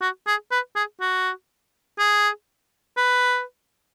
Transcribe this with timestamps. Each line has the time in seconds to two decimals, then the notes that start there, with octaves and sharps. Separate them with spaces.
0.01 F#4
0.27 G#4
0.52 B4
0.76 G#4
1.01 F#4
1.99 G#4
2.97 B4